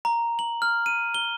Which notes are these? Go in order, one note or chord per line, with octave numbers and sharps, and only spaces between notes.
A#5
F#7
F6
D#7
G7